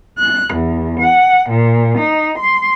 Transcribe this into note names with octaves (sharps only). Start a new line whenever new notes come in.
F#6
E2
F#5
A#2
D#4
C6